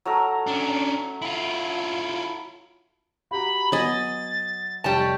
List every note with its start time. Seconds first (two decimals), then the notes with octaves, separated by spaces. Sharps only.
0.05 F#3 A3 A#4
0.47 C#4 D4
1.22 E4 F4
3.31 F#4 G4 A#5 B5
3.72 F#3 B3 D#5 G#5 A6
4.84 F1 G3 C#5 A5